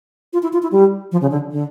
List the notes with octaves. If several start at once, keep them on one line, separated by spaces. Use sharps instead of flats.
F4
E4
F4
E4
G3
F3
C#3
D3
D3